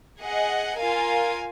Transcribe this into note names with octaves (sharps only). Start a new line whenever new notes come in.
G#4 D#5 F#5
F4 A#4 F5 G#5